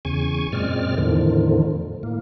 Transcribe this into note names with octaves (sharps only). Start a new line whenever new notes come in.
E2 C#3 G#5 C#6
F#2 A#2 G#3 C4 D5 F6
E2 A2 D3 D#3 F3
A2 A#3